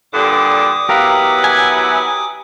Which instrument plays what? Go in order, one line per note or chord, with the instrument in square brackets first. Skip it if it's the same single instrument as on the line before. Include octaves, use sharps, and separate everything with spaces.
[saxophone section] G2 A#2 D3 [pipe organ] D6 D#6
[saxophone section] F#3 B3 E4 [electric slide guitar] G4 A#4 F5
[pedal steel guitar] G#5